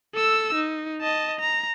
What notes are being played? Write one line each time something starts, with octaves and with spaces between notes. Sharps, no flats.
A4 E6
D#4
D#5 A5
A#5